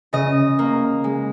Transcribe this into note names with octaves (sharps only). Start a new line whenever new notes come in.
C#3 D#5
A#3
G#3